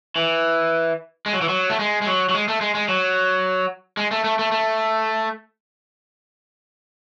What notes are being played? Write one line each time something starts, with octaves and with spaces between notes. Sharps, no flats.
E3
G#3
F#3
E3
F#3
A3
G#3
G#3
F#3
F#3
G#3
A3
G#3
G#3
F#3
G#3
A3
A3
A3
A3